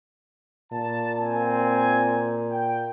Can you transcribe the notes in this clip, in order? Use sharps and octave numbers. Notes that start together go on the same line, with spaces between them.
A#2 A5
C4 G#5
G5